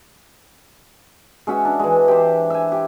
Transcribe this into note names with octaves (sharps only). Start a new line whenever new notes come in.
G#3 C#4 F#4 E5
D4
E3 G#3
G4 C5
E5 G#5
G4